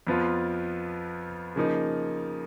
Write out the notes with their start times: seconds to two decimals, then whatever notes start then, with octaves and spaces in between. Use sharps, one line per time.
0.07 F2 F3 B3 F4
1.56 C#3 F3 A#3 D#4